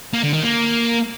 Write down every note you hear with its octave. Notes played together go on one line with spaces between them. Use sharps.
A#3
D3
D#3
A#3